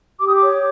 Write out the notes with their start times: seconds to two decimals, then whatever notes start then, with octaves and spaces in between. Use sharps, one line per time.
0.19 G4 D6
0.28 D#6
0.36 D6
0.42 C#5